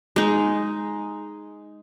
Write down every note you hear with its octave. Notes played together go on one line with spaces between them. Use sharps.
G#3 D#4